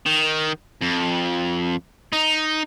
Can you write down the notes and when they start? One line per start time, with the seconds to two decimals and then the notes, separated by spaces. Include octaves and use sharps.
0.06 D#3
0.81 F2
2.13 D#4